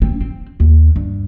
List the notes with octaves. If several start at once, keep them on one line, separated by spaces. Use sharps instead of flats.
C4
C4
D#2
G2